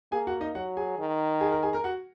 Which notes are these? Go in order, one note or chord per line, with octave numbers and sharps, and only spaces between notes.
A#3 G#4 G#5
F#4 F#5
D#4 D#5
F#3 F#4 F#5
G#4 G#5
D#3
G#4 G#5
A#4 A#5
G#4 G#5
A#4 A#5
F#4 F#5